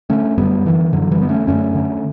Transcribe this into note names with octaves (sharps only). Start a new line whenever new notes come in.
D3 A3 C#4
F#2 G3 B3
D3 E3
F#2 D3 F#3
E3 G3
D3 B3
A3 C#4
F#2 A3 C#4
D3